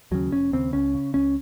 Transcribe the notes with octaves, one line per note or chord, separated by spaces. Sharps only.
D#2 C#3 F#3
F1 C#4
D#2 C#3 C4
C#2 C#4
C#3
C#2 C#4